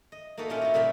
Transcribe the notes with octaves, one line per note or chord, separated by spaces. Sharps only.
D#5
A#3 D#4 F#4 A4 B4
A#2 C#4 E4 F4 G4 A#4
F4 F#4
A#2 C#3 G3 A#3 E5 B5